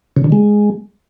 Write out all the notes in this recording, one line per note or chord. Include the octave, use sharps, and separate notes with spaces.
C#3
D3
G#3